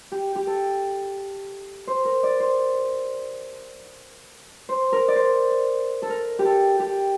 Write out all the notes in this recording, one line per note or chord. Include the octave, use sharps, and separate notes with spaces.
G4
G4
A4
C5
A#4
D5
C5
C5
A#4
D5
C5
A4
A#4
G4
A4
G4